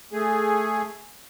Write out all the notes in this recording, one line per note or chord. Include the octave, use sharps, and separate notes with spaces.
A3 G#4